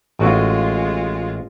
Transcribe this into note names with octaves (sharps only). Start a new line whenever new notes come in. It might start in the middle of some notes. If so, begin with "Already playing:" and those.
A1 G#3 F4 F#4 F5